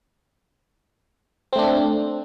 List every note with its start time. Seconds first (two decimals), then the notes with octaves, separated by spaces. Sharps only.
1.53 C4
1.56 A3
1.59 D4